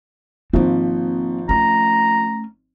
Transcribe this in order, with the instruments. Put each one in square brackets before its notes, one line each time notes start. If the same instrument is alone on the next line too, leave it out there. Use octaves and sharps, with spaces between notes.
[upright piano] G#1 F3 [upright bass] A#3 C4
[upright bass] A3 C#4 [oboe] A#5